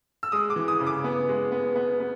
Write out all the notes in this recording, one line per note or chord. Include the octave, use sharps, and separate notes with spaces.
E6
G#3 D#6
D6
E3
D#6
C#3
D6
B3
G#3
B3
B3
B3